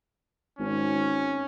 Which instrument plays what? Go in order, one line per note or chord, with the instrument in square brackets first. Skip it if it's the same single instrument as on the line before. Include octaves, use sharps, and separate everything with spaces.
[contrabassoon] G#1 [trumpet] C#4